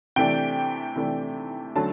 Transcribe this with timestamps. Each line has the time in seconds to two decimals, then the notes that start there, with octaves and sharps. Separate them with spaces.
0.16 C3 E3 A3 D4 G5
0.96 C3 E3 A3 D4
1.76 D3 F#3 A3 C#4 A5